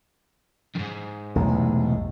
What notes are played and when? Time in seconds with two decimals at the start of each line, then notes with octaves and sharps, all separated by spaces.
0.75 F2 G#2
1.36 B1 E2 A2 C3